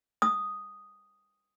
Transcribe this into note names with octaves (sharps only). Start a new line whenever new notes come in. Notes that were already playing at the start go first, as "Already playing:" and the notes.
D#6